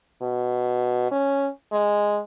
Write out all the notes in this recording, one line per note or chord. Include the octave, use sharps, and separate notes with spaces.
B2
C#4
G#3